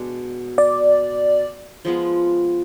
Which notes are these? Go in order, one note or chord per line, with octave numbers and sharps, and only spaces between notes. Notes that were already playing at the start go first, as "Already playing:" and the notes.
Already playing: B2 G#3 D4
D5
F3 G#3 B3 F4